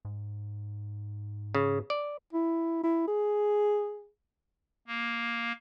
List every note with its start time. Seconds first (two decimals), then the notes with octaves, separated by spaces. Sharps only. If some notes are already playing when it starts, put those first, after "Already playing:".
0.05 G#2
1.55 C#3
1.90 D5
2.33 E4
2.83 E4
3.08 G#4
4.87 A#3